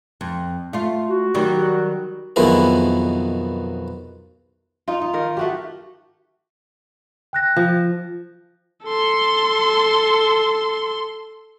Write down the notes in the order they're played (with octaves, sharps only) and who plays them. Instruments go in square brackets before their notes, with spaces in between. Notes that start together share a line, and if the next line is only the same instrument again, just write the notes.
[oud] F2
A3 F4
[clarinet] F#4
[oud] D#3 F#3 G3
[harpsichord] B1 F2 B2 D#3 E4 G#4
[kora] D#4 F4
D#4
D#3 A#4
A3 F#4 G4
[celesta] G5 F#6 A#6
[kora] F3
[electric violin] A4 C6